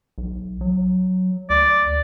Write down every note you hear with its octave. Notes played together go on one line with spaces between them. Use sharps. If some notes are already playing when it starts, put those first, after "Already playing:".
B1
F#3
D2 D5